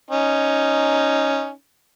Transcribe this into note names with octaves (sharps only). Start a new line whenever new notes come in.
C#4 D#4